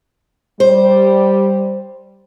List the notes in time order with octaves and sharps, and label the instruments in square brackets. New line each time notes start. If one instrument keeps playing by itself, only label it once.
[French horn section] G3 [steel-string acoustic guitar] C5